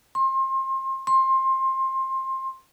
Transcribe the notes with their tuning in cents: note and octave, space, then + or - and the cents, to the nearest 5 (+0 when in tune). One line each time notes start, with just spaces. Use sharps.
C6 +30
C6 +20